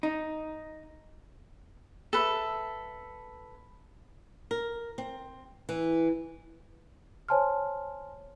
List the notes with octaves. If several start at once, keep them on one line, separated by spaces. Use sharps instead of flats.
D#4
A4 B4 E5
A#4
C4
E3
C5 C#5 G#5 A5 C6 F6